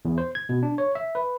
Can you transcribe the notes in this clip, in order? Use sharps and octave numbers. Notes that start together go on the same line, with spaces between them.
E2
C5
G#6
B2
D4
C#5
E5
B4